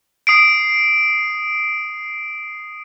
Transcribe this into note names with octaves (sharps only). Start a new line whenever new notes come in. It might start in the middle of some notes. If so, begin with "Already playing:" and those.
D#6 C7 D7